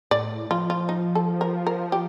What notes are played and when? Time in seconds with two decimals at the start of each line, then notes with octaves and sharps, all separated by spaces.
0.11 A2 D5
0.51 F3 F4
0.70 F4
0.89 D#4
1.15 A4
1.41 A#4
1.67 A#4
1.92 G4